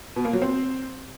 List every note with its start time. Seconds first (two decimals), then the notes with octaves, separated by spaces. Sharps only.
0.16 B2
0.25 A#3
0.33 F#3
0.42 C4